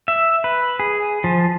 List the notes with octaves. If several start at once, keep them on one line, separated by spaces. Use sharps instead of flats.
E5
B4
G#4
F3